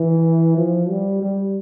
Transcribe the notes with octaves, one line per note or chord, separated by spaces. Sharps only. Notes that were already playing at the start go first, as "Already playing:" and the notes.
Already playing: E3
F3
G3
G3